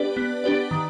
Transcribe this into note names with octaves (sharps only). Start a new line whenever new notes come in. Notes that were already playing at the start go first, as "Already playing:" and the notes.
Already playing: B3 D4 G4 B4 D5
B3
D4 G4 B4 D5
D#3